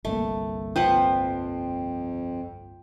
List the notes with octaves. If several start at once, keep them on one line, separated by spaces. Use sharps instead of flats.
G1 C2 A3 A#3
F2 F3 B4 F#5 G5 G6